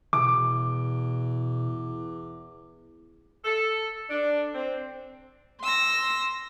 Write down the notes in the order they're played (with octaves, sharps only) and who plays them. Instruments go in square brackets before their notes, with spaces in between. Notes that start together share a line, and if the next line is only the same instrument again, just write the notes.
[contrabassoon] E2 [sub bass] B2 [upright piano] D6
[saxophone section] A4
D4
C4
[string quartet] C6 E6 A#6